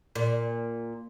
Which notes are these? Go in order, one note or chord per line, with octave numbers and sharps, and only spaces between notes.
A#2